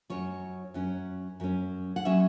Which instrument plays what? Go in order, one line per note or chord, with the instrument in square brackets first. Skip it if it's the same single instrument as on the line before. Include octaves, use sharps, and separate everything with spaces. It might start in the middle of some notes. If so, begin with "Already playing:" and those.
[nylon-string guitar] F#2 F#3 C#4 C#5
F#2 F#3 C#4
F#2 F#3 C#4
F#5
F#3 C#4 E5